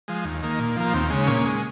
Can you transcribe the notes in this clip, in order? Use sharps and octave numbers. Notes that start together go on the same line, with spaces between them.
F3 G#3
D#2
D#3 A#3
A#2
F3 A#3
D#2 C4
C#3 G#3
A#2 C#4
G#3